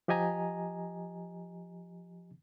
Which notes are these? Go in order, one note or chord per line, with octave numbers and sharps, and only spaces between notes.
F3 G4 D#5 G#5 A#5